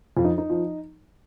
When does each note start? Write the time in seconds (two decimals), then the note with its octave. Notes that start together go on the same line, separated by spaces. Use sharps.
0.16 F2 F4
0.25 D#4
0.38 D#4
0.50 F3